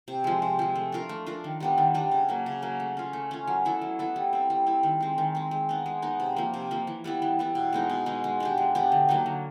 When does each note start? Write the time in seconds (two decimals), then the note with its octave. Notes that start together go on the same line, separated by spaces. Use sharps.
0.08 C3
0.24 F3 G#3
0.42 C3
0.59 F3 G#3
0.75 A3
0.92 D4 F4 A#4
1.09 A3
1.27 D4 F4 A#4
1.44 D#3
1.60 G3 B3 D4
1.78 D#3
1.94 G3 B3 D4
2.11 C#3
2.29 F#3 A#3
2.46 C#3
2.62 F#3 A#3
2.80 A3
2.97 C#4 F4
3.13 A3
3.31 C#4 F4
3.47 F#3
3.65 B3 E4 A4
3.82 F#3
3.99 B3 E4 A4
4.16 G3
4.33 C4 E4
4.50 G3
4.67 C4 E4
4.83 D#3
5.00 G#3 C4
5.18 D#3
5.35 G#3 C4
5.51 G#3
5.69 B3 D#4
5.86 G#3
6.02 B3 D#4
6.20 C3
6.36 F3 A#3
6.54 C3
6.71 F3 A#3
6.87 E3
7.04 G3 B3 E4
7.22 E3
7.39 G3 B3 E4
7.55 B2
7.73 G#3 B3 D#4
7.90 B2
8.06 G#3 B3 D#4
8.24 G#3
8.40 B3 D4 G4
8.58 G#3
8.75 B3 D4 G4
8.92 D3
9.09 F#3 A#3 D#4
9.26 D3